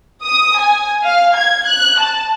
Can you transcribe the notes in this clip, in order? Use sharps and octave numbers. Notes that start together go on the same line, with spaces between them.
D#6
G#5
F5
G#6
F#6
A5